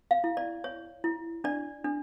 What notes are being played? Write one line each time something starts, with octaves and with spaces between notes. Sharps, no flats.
F5
E4
D5
C#5
E4
D4 D5
D4